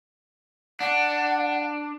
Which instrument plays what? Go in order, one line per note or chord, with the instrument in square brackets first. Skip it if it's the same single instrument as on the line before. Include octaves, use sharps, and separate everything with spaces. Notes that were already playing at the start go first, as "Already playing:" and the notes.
[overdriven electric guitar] D4 [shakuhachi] F#5